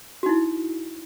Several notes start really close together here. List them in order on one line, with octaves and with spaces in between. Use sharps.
F#4 D#4 E4